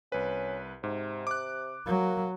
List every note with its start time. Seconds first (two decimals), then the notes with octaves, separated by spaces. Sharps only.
0.12 C2 C#4 B4
0.84 G#2 C3
1.27 D6 F#6
1.87 F#3 A#3